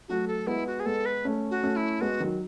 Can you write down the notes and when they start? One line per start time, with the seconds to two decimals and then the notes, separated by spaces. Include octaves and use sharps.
0.08 F#3 A3 F#4
0.28 A4
0.47 G#3 B3 E4
0.67 F#4
0.80 G#4
0.85 G#3 B3 A4
1.06 B4
1.25 A3 C#4
1.51 F#4
1.63 A3 C#4
1.76 E4
2.01 G#3 B3 F#4
2.20 D#3 F#3